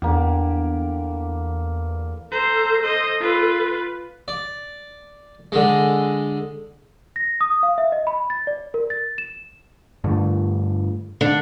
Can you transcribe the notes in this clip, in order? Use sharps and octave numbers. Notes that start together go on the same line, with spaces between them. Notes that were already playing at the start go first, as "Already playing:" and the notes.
E2 D3 A#3 G4
A4 C5 A#5
A4 C5 D#5
F4 B4
D5
D3 G#3
A#6
D#6
F5
E5
D#5
B5
A6
D5
A#4
A6
E7
G2 D3 A3
D3 D4